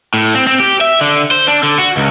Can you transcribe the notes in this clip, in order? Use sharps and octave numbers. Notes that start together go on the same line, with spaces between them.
A2
C4
C4
G4
E5
D3
C5
D4
D3
F#4
C#2